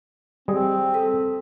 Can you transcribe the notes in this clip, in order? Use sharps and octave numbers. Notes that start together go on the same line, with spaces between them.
G3 C4 G#4 D#5
A4